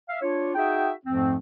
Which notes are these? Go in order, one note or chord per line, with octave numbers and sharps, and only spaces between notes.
E5 F5
D4 F4 C#5
D#4 F#4 G#4 E5 G5
F2 G#2 F3 A3 C4